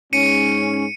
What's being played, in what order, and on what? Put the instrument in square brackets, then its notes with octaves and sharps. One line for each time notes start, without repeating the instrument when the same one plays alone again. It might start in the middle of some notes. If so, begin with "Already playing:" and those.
[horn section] G#2 G#3 C#4 [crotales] C#7 D#7